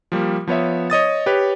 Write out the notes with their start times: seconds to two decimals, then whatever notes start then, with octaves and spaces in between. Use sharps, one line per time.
0.12 F3 G3 A#3
0.47 F3 B3 C#5 E5
0.90 C#5 D#5 D#6 A6
1.26 G4 B4 C#5